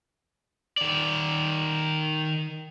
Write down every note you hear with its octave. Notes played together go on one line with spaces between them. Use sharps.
D#3 D5